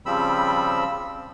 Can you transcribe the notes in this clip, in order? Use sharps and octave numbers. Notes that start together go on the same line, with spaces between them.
C#3 F3 G3 C4 B5 E6